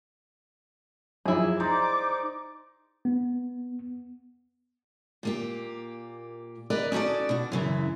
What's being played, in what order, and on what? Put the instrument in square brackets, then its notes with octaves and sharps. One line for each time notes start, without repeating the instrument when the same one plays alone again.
[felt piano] F#2 F3 [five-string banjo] E4 G#4
[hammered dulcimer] D#4 C5 D5 [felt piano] A#5 [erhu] D6
[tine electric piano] B3
[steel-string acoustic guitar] A#2 A#3 G4
A#4 B4 D5 D#5
C#4 D#4 F#4 A4 D5
B2 F#4
F#2 C#3 E3